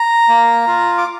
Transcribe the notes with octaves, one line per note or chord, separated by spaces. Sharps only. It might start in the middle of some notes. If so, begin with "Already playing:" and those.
Already playing: A#5
A#3
F4
D6